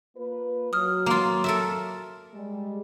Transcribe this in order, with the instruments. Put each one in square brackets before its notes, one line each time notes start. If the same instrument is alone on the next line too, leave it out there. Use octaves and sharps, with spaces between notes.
[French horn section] A#3 F4 B4
[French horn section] F#3 [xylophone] D#6 F6
[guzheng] A#3 F4 [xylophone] A#5 C6
[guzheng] A4 A#4 E5
[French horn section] G3 G#3